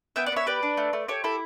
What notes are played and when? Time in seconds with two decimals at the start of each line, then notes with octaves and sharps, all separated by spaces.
0.16 B3 E5 G5
0.26 D5 F#5
0.32 B3 C#5 E5
0.47 G4 B4 D5
0.63 D4
0.77 A3
0.93 A3
1.08 G4 A4 C#5
1.24 E4 A4